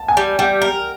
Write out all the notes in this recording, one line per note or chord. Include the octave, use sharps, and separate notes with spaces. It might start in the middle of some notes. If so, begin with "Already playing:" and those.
Already playing: A5
G#5
G3
G3 G5
A#4